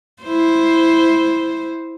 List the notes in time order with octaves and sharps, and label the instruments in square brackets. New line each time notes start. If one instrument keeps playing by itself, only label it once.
[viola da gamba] E4 C5